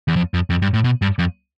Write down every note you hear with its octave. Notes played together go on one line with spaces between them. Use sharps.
E2
F2
F2
F2
G2
A2
B2
G2
F2